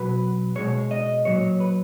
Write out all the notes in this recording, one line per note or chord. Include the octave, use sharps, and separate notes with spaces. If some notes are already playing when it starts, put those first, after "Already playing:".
Already playing: B2 F#3 B4
B2 G#3 C#5
D#5
A#2 F#3 C#5
B4